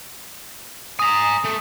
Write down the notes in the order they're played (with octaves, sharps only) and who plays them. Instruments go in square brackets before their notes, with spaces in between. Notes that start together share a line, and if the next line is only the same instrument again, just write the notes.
[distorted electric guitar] G#5 A#5 [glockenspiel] D#6
[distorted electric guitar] A3